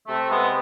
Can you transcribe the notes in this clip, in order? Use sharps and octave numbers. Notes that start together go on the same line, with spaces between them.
C3 A3
G#3 B3